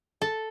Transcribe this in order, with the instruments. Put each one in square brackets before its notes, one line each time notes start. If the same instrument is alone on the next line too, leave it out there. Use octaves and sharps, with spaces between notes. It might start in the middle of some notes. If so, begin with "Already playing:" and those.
[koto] A4